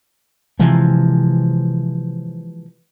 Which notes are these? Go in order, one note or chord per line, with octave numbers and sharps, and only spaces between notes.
C3 E3 F3 G#3